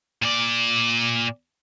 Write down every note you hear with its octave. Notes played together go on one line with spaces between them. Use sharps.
A#2 D5